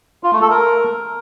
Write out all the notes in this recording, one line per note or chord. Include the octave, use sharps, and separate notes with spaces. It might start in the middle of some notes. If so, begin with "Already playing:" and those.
F4
A3
A4
A#4